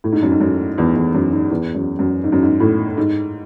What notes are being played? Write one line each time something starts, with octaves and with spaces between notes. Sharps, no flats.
A2
G#2
F#2
G#2
F#2
E2
E2
F#2
G#2
E2
F#2
F#2
G#2
F#2
G#2
A2
G#2